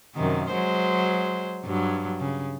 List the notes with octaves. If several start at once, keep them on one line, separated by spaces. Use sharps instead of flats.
F#2 C3 D#3
F#3 G#3 C5
G2 F#3
C#3